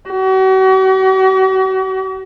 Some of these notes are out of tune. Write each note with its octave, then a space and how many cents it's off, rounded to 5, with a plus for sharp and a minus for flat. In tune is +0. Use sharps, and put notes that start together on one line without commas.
F#4 +40